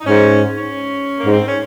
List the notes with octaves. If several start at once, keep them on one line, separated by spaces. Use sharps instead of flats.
D#4
G#2 C#4
C#4
A#3
G#2
C4
C#4